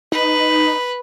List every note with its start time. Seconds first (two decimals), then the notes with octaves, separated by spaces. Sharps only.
0.12 D#4 B4